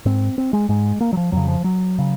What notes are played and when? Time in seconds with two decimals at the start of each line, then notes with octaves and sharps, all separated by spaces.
0.06 G#2 C4
0.38 C4
0.53 G#3
0.69 G#2 G#3
1.01 A#3
1.13 F#3
1.17 F3
1.32 F2 C#3 F#3
1.48 F3
1.64 F#3
1.99 C#3